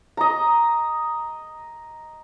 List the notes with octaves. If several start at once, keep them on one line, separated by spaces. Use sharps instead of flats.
D#5 A#5